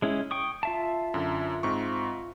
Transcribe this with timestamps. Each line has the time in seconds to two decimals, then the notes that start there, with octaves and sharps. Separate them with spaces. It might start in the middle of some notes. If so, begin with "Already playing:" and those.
0.02 G#3 C#4 E4
0.31 G5 C#6 D#6
0.63 F4 E5 A5
1.14 F#2 D3
1.63 G#2 C4 C#6